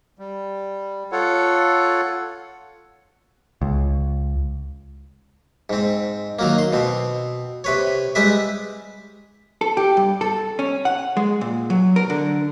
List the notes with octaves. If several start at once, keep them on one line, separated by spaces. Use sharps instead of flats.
G3
F4 A4 C#5 F#5
C#2
G#2 C4
D#3 F#3 A#3
C6
B2 C4
C3 B4 C#5
G3 G#3 G4 B4 E5
A4
G4
G2
A4
C#4
F#5
G#3
A#2
F#3
A#4
D3